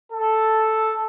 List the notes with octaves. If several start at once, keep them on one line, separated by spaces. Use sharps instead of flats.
A4